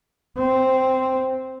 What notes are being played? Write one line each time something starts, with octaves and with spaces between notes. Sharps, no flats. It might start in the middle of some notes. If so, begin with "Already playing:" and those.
C4